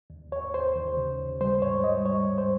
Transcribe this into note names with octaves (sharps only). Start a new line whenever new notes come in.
D#2
D#2 C#5
D#2 C5
D#2
C#3
D#2
G3 C5
G#2 C#5
G3 D#5
G3 C#5
G#2
C5